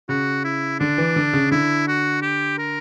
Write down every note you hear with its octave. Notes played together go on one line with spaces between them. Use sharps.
C#3 F#4
E4
D3 D4
E3
D3
C#3
D3 E4
F#4
G4
A#4